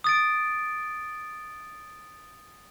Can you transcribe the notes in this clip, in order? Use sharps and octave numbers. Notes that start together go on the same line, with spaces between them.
D#6 A6 D7